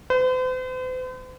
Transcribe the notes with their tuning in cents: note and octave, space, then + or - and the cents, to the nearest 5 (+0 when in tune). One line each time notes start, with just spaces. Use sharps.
C5 -45